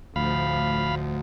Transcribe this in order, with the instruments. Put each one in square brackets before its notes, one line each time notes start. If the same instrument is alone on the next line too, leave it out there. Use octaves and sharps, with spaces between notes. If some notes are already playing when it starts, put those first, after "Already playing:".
[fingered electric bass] D2 [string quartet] A2 F3 [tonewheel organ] F5 B5